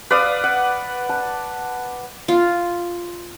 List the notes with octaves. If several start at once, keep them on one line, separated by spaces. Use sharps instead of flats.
B4 D5 F5 D#6
F#5
A5
F4